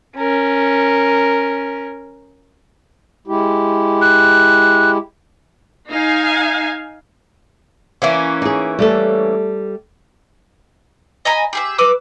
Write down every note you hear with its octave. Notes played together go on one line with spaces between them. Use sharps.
C#4 A#4
G#3 E4 G4
F#6
D#4 F5 G#5
E3 A#3 C#4
D#4 G#4
G3 A3 A4
D#5 G#5 A#5 B5
G4 G#4 E5
B4 D6 E6 F#6